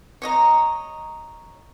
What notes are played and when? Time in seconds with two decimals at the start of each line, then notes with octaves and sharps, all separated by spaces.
0.22 C#5 D#5 A#5